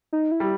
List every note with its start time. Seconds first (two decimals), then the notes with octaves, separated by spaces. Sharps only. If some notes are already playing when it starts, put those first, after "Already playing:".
0.13 D#4
0.32 E4
0.40 G3